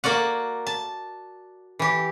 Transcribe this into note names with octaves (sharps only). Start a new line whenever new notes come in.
A#3 F#4 D5 F#5
A5
E3 G4